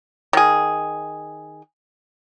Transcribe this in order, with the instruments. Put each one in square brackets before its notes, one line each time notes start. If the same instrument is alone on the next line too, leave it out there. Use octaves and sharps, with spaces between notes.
[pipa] D#3 G#4